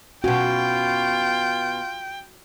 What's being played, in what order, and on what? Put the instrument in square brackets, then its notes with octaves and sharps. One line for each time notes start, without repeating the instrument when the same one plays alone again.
[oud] B2 C#4 [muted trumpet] F4 [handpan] F#4 [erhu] G5